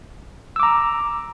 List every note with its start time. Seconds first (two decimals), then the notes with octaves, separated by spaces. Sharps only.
0.56 E6
0.60 D6
0.63 A#5